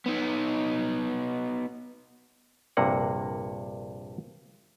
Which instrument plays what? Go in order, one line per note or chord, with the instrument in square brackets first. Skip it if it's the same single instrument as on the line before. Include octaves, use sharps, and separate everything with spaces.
[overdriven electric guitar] B3 D#4
[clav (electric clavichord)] A#1 G2 C3 A#3 F#5